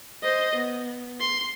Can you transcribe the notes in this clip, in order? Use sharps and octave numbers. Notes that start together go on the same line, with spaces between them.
C5 D#5
B3
C6